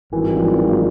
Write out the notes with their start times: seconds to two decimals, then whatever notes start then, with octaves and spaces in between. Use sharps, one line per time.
0.13 G#1 G2 D#3 E3
0.35 F3
0.57 F#3